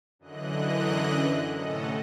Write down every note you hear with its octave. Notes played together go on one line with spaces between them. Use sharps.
F#2 D3 E3 D#5 F#6
A2 C3 C#4 A4 D#5 F#5